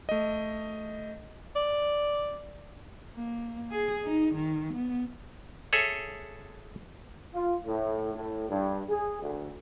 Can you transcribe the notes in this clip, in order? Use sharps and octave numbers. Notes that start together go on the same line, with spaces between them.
A3 D#5
D5
A#3
G#4
D#4
D#3
B3
G#4 A4 C#5 E5
F4
A2
A2
G2
G#4
D2